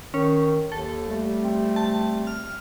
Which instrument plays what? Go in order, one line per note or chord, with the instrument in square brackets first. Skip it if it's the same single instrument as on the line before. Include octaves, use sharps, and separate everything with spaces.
[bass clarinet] D#3 [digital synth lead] C#4
[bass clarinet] D#2 [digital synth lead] A4
[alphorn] G3 [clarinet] A3
[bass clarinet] C4
[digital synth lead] A5
F6